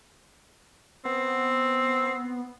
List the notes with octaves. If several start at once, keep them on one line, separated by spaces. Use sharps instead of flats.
B3 C4